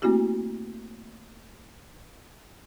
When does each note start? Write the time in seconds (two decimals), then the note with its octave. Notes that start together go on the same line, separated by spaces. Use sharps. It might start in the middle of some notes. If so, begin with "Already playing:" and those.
0.02 A3 A#3 C4 E4 F#4 G4